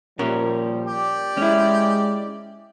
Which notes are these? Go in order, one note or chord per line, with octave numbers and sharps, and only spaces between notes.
A#2 F3 G3 C#4 A#4
G4 D5
G#3 C#4 E4